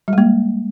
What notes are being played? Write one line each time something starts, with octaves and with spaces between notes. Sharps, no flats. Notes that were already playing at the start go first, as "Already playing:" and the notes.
G3 G#3 A#3